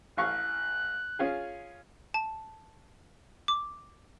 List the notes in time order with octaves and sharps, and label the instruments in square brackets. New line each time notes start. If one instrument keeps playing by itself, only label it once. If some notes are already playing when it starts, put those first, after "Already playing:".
[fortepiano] A1 F5 C#6 [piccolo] F#6
[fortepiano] C#4 F4 G#4
[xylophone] A5
D6